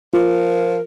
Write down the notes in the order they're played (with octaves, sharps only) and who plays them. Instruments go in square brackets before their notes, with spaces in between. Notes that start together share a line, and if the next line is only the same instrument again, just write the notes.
[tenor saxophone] F3 [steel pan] F4 [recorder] A#4